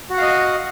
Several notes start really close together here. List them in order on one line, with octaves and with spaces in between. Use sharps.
F#4 F#5 F5 D#5